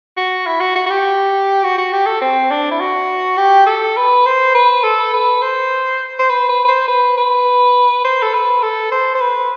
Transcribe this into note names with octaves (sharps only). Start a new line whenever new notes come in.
F#4
E4
F#4
F#4
F#4
G4
F#4
F#4
G4
A4
C4
D4
E4
F#4
G4
A4
B4
C5
B4
A4
B4
C5
C5
B4
B4
B4
C5
B4
B4
C5
A4
B4
A4
C5
C5
B4